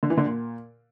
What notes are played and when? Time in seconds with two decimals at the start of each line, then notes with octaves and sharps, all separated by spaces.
0.03 D3
0.10 E3
0.17 D3
0.25 A#2